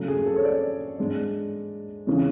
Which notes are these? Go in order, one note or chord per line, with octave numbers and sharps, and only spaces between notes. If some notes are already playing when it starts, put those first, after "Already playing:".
Already playing: C#3 F#3 A3
G#4
A4
C#5
D5
G#2 G#3 D4
C#3 E3 G#3 C#4